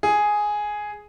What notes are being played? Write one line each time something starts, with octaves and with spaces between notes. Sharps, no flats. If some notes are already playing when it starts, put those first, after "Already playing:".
G#4